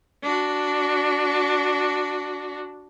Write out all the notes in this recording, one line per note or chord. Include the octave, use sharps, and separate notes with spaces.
D4 F#4